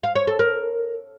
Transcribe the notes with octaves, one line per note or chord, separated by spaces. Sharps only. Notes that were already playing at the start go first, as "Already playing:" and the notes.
F5
C#5
A4
A#4